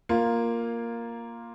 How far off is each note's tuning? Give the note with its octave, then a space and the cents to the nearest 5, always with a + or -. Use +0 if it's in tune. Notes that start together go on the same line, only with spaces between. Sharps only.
A#3 +0 F4 +0